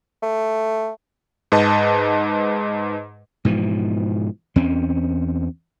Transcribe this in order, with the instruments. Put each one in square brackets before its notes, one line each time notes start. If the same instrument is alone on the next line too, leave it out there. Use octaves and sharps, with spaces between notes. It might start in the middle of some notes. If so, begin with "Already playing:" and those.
[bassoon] A3
[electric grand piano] G#2 B4 D#5 A5
[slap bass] G#2 B2 E3 F3
E2 C4 C#4